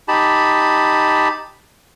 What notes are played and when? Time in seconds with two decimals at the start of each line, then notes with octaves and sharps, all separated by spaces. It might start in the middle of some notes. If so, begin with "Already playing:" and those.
0.08 D#4 G4 A5 B5